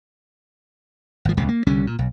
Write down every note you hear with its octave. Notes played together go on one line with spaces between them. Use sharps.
G#1 F3
D#1 C#2 C3
A#3
C2 D3 G3 C#4
A#2
B1